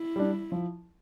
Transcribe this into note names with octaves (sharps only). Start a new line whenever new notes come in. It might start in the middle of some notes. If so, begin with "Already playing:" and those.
Already playing: E4
G3 D4
F3